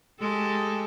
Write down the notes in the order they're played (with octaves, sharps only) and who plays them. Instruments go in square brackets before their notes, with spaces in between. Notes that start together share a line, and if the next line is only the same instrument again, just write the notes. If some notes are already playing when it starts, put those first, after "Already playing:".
[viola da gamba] G#3 G4 A4